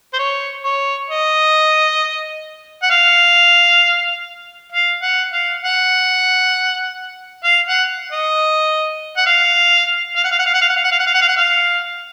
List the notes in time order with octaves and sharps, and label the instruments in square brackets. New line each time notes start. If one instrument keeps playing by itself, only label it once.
[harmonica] C5
C#5
C#5
D#5
F#5
F5
F5
F#5
F5
F#5
F5
F#5
D#5
F#5
F5
F5
F#5
F5
F#5
F5
F#5
F5
F#5
F5
F#5
F5
F#5
F5
F#5
F5
F#5
F5